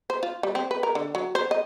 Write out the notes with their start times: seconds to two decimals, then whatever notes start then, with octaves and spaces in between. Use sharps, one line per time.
0.10 C5
0.23 F4
0.43 G3
0.55 C4
0.71 B4
0.83 A#4
0.95 D3
1.15 F#3
1.35 C5
1.51 D#5